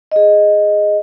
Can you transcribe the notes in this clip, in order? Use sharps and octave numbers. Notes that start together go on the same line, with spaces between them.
G#4 D#5